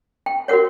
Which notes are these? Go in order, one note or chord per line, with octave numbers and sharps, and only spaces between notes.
G5
F#4 A#4 C#5 F#5